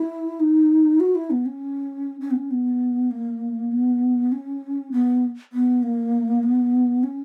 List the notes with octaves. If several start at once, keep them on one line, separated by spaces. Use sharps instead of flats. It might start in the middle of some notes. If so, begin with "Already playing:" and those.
Already playing: E4
D#4
F#4
E4
B3
C#4
C#4
B3
C#4
B3
A#3
B3
C#4
B3
B3
A#3
B3
C#4